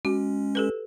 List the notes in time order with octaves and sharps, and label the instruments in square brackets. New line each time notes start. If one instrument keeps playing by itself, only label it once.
[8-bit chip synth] G#3 C#4 [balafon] F#4
[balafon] G4 A4 B4